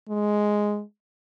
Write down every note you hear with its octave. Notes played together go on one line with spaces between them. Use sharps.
G#3